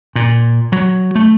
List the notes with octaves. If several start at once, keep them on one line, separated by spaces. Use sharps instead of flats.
A#2
F#3
A3